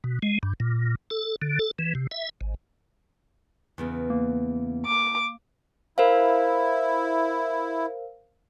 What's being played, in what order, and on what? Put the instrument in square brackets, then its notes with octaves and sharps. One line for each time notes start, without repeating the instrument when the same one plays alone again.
[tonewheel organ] B2
G#3
G2
A#2
A4
D3
A4
E3
C3
E5
G#1
[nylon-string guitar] E2 C#3 B3
[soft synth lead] A#3
[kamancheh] D6
[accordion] E4 [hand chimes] A#4 C5 F5